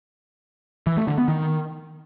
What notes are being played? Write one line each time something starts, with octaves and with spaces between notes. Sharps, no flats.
E3
A3
D3
B3
D#3